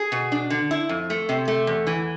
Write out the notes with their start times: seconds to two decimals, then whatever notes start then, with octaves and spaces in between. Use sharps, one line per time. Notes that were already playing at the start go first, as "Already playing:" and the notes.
Already playing: G#4
0.12 B2
0.32 D4
0.50 D3
0.71 E4
0.89 F2
1.10 A3
1.29 C3
1.48 A3
1.67 E2
1.87 E3